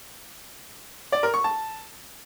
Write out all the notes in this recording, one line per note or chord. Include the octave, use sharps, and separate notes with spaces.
D5
A#4
C#6
A5